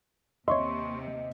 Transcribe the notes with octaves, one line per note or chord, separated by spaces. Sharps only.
D#2 C3 C#5 D#5 E5 C6 C#6